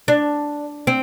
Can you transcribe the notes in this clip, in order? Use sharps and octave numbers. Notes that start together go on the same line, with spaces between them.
D4
C4